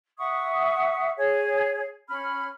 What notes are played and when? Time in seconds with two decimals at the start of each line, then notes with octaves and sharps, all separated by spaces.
0.18 E5 F#5 C#6 D#6
1.17 G#4 C#5
2.08 C#4 B5 F6